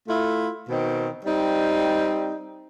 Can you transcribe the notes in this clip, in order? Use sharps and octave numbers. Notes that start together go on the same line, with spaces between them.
A3 E4 F4
B2 D#3 C4
G3 C4 D#4